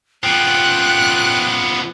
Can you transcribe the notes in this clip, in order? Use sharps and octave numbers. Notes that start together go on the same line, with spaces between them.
F3 B3 G5 F#6